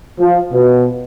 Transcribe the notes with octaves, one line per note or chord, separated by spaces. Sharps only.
F3
B2